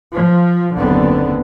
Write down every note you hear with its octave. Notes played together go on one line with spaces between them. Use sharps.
F3
F#1 D#2 D3 B3 C4